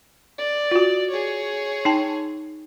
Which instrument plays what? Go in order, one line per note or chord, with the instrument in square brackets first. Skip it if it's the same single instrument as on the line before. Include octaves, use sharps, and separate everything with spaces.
[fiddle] D5
[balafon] F4 F#4
[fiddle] G#4 C#5
[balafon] D#4 G5 A5